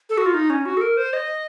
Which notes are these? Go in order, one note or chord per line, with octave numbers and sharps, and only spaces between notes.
A4
F#4
F4
D#4
C#4
F#4
A4
A#4
C5
D#5